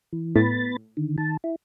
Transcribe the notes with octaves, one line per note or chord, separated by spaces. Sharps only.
E3
A2 B3 B5 A6
D3 D#3
D#3 A5
E4